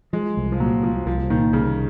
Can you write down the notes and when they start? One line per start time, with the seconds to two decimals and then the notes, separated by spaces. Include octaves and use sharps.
0.13 F3 G#3
0.37 C2
0.52 F3
0.60 A#2 F#3
0.83 C2 F3
1.06 C2 F3
1.30 A#2 D#3
1.53 C2 C#3